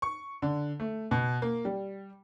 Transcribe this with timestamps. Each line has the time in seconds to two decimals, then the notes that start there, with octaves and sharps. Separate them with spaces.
0.02 C#6
0.42 D3
0.80 A3
1.11 B2
1.42 A#3
1.65 G3